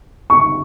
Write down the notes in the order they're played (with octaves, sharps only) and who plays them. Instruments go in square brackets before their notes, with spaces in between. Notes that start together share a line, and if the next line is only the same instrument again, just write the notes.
[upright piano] C#6